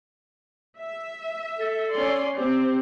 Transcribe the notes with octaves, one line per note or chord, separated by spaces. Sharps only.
E5
A4
C#4 D5 C6
C4 G4